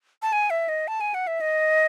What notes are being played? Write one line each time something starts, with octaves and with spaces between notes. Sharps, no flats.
A5
G#5
E5
D#5
A5
G#5
F#5
E5
D#5